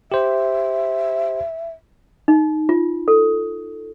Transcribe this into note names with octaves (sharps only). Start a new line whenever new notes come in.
G4 C5 E5
D#4
F4
A4